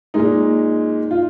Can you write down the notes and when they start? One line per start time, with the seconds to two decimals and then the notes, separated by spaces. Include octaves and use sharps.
0.14 A#2 G#3 D#4
1.11 F4